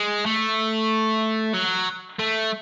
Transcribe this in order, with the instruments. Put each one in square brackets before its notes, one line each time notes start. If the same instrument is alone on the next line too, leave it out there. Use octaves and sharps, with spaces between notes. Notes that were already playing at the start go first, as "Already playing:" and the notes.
Already playing: [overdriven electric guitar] G#3
A3
F#3
A3